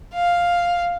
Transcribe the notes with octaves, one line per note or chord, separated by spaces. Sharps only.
F5